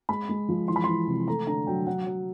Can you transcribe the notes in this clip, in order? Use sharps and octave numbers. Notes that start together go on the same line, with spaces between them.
G#3 B5
G#3
F3
E3 C6
B5
E3 C6
C3
A3 A#5
D3 A#5
F#3 G5
F#3 F#5
F#3